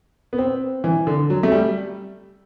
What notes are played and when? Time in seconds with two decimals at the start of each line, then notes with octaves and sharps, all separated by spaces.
0.33 B3
0.38 C4
0.84 E3
1.07 D3
1.30 F#3
1.43 A3
1.52 G3